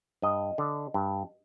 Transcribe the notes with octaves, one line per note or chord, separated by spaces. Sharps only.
G2 D#5
D3
G2